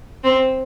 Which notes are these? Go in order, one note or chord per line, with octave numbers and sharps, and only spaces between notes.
C4